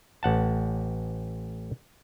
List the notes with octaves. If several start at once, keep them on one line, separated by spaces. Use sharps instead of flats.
A1 F#5 A5